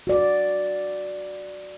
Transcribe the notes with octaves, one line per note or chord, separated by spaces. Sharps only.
F#4 D5